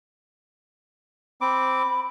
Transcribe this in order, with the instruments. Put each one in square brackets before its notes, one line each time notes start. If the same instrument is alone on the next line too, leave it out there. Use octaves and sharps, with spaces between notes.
[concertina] C4 D6 [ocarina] B5